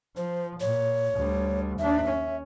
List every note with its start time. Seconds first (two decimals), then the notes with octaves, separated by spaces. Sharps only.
0.17 F3 C5
0.60 A#2 C#5
1.14 D2 G3
1.79 D#2 D4 E5
2.08 C#4